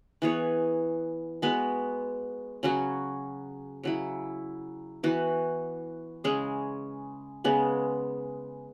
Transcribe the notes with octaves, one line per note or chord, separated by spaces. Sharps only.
E3 B3 G#4 C#5
G#3 B3 F#4 B4
C#3 F#3 C#4 F#4
C#3 F#3 E4
E3 B3 F#4 B4
C#3 G#3 C#4 G#4
C#3 G#3 B3